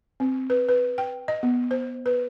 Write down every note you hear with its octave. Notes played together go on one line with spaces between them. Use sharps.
C4
B4
B4
G5
D#5
B3
C5
B4